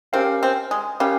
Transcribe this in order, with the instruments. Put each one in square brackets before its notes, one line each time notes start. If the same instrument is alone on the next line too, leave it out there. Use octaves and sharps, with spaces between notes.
[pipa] C4 [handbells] C#4 G4 A#4 F5
[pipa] C4
G#3
[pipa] G3 [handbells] C#4 G4 A#4 F5